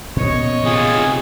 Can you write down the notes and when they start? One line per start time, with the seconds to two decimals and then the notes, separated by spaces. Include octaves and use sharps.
0.16 A#2 B3 C#4 C#5 D#5
0.65 C3 F4 G#4